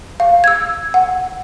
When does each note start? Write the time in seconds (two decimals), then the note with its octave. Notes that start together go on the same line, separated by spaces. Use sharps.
0.20 F5
0.44 E6 G#6
0.94 F#5